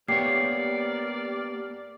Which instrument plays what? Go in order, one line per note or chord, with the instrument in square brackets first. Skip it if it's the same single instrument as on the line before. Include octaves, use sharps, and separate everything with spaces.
[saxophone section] G2 A#4 D5 [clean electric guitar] A#3 B3 C#5 [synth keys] G4 [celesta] C7